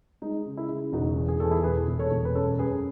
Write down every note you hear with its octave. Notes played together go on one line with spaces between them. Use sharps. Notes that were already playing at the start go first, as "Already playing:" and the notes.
G#3 D#4
C#3
E4
C#3
E1 D#4 F#4
E2
G#4
E2 A4
E4 G#4
E1 G#4 B4
E1
A4 C#5
E1
B4
F#2 A4 C#5
F#2 G#4 B4